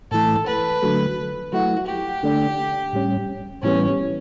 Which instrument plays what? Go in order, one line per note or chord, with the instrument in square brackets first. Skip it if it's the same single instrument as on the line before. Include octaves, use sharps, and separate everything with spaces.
[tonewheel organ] A2 E3 A3 [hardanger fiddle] A4
[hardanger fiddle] B4
[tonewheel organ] D3 F#3 A3
[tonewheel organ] F#3 A3 E4 [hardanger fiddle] F#4
[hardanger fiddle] G4
[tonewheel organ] D3 A3 D4
A2 G3 C#4
[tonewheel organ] A2 E3 G3 B3 [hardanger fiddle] C#4